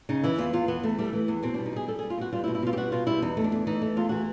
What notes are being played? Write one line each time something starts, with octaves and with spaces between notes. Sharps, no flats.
C#3 D#4
E3 E4
E2 F4
E2 F4
E2 B3
E2 A3
G3 A3
E3
E2 B3
B2 C4
G3 D4
D#4
G3 G#4
G3 A4
G3 G#4
F4
B2 F#4
G3 F4
E4
B2
E4
B2 F4
G4
G3 F#4
B2 F4
G3 E4
E2 D#4
A3
D4
E2
E3 D#4
A3
E2 F4
E3 F#4